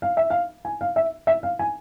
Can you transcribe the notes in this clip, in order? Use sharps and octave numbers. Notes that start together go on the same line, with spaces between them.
F5
E5
F5
G#5
F5
E5
E5
F5
G#5